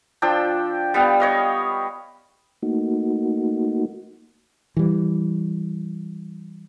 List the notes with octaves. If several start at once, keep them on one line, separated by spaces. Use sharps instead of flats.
F3 D4 G5 E6
G3 B3 F5
C#5 D#5 F5
A3 A#3 D#4 F#4
E3 G3